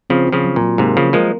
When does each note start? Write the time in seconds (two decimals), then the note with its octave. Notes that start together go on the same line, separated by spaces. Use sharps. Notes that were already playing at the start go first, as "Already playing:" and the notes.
0.10 C#3 F3 C4
0.27 F4
0.32 C#3 F3
0.44 F#3
0.56 A#2
0.61 F#3
0.78 G#2 C3 A#3
0.97 C#3 F3 F4
1.13 F3 G#3 A#4